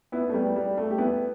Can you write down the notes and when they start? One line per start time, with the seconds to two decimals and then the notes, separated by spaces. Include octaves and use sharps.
0.12 B3 E4
0.29 A3
0.34 G3 B3
0.56 G3
0.78 A3
0.91 G4
0.98 B3 E4